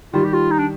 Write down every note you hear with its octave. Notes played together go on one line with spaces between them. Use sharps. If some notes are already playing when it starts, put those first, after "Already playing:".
D#3 G3 F4
G4
F4
D#4
D4